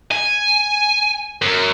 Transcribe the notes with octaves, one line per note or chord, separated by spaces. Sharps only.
G#5
F#2